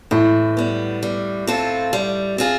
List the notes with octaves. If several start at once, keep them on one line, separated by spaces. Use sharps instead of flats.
A2 E3
G3 B3
G3
C4 F4 A4
G3
C4 F4 G#4